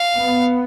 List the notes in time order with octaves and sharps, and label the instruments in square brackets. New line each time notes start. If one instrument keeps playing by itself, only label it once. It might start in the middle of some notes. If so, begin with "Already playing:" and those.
Already playing: [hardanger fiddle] F5
[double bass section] B3